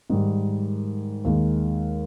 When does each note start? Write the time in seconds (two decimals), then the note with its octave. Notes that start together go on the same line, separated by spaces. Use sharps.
0.10 G#2 D#3 G3
1.25 D#2 D#3 G#3